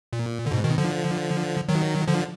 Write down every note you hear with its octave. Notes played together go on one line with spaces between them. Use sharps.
A#2
D3
G#2 B2
B2 D#3
D3 F3
D#3 F#3
D3 F3